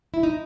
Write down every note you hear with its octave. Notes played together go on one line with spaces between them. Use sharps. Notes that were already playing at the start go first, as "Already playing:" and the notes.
E4
D#4